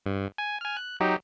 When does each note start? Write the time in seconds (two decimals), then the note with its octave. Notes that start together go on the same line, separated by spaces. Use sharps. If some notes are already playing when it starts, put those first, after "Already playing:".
0.06 G2
0.38 G#5
0.61 G#5 F6
0.77 F#6
1.00 F#3 D#4 G4